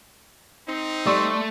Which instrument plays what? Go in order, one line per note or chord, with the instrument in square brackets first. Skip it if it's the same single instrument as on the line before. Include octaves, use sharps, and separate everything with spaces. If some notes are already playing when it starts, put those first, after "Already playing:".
[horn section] C4 D#4
[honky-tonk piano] G3 D5 [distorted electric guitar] A3 [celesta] C6 C#6 E6